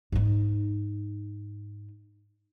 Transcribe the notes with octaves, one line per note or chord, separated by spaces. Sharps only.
G#2 D#4